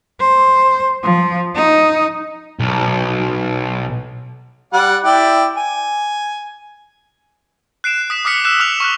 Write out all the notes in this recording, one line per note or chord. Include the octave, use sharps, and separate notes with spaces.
C5
F3
D#4
B1
G3 D5 F#5
E4 D5 G5
G#5
F#6 C7 D7 E7
D#6 B6 E7
D6 D#6 F6 B6 C#7
E6 F#6 E7
D#6 F6 F7
C#6 F6 F#6